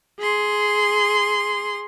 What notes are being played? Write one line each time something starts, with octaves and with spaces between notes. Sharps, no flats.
G#4 C6